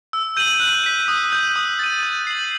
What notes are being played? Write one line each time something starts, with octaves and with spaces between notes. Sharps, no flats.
E6
G6 D#7 F#7
F#6
B6 D#7
D#6
G6 D#7
D#6
A6 D#7
G6
C7 F#7